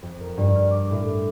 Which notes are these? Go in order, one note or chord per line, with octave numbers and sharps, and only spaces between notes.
F2
A#4
G2
F6
D6
A2